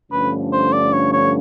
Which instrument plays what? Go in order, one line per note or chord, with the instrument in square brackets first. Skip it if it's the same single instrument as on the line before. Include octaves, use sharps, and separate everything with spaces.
[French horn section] G2 D3 F3 A3 C#4 [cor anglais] B4
[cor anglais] C5
D5
C#5
C#5